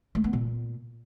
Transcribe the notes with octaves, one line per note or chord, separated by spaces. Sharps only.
A3
B3
A#2